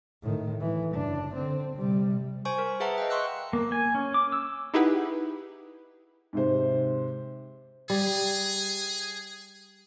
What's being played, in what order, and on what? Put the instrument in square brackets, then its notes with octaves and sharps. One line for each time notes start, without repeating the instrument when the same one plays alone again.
[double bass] A2 D#3
E3
F#1 D4
D3 C4
C3 G3
[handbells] C5 G#5 C#6
A#4
G#4 B4 E5 F#5 A5 A#5
D#5 F5 G5
C6 C#6 E6 F#6
[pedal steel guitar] A#3
G#5
C#4
D6
E6
[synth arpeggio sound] D#4 E4 G4 G#4 B4 F#5
[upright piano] G#2 C3 C5
[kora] G3 [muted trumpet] G#4